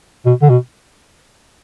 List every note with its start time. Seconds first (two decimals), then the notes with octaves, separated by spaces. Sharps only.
0.26 B2
0.42 D3
0.50 B2